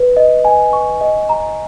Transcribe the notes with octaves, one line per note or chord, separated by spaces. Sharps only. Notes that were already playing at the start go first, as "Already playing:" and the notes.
Already playing: B4
D#5
G#5
C#6
D#5
A#5